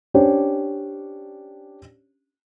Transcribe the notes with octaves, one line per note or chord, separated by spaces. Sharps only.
C#4 D4 G4 C5 C#5